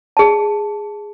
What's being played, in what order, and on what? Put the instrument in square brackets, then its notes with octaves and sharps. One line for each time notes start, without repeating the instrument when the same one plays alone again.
[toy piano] G#4 A5